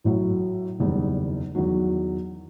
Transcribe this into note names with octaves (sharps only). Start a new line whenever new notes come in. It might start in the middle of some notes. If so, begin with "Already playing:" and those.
A1 A2 F#3
F#1 E2 D#3 G3
E2 D#3 F#3